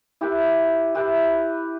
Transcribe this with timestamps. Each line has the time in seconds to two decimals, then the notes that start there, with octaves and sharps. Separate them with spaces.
0.21 E4 G4 B4
0.95 E4 G4 B4